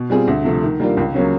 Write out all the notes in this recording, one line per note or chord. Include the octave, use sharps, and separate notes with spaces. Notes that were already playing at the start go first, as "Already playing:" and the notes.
Already playing: B2
G3 C4 F4 G#4
D2
C3 F3 A3
D#3
G3 A#3 D4 F4
C#2
C#3 F#3 A#3 C#4